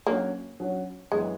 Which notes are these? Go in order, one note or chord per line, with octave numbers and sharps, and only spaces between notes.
F#3 A#3 C#4 F#4 C#5
F#3 C#4 F#4 C#5
F#2 E3 G#3 B3